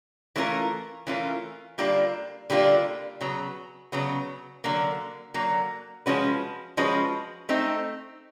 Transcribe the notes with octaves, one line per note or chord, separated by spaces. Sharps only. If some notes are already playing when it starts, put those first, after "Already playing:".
E3 A3 C#4 F4 A#4
E3 A3 C#4 F4 A#4
D3 G3 A#3 D4 F4
D3 G3 A#3 D4 F4
C#3 F#3 B3
C#3 F#3 B3
D3 F#3 A#3
D3 F#3 A#3
F3 G#3 C#4 F#4 B4
F3 G#3 C#4 F#4 B4
A3 C4 D#4